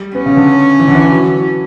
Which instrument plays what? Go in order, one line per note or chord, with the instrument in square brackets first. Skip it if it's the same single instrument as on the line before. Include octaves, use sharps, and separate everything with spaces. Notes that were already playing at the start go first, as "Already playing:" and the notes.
Already playing: [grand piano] G3
[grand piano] B3 [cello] C#4
[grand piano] C#3
D3
E3
D3
E3
F#3